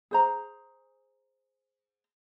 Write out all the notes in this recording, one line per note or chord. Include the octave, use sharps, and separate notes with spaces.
G#4 C5 A#5